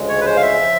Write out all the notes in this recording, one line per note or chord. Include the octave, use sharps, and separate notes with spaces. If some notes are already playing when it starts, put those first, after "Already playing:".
Already playing: D2 C#3 F3 G#3
C#5
B4
C5
F5
E5
C#3 F3